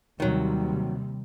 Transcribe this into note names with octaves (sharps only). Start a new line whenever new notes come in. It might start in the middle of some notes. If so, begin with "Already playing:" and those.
D#2 C3 D#3 F#3 G3